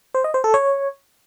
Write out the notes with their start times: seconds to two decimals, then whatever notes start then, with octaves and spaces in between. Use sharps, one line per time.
0.15 C5
0.24 D#5
0.34 C5
0.44 A4
0.54 C#5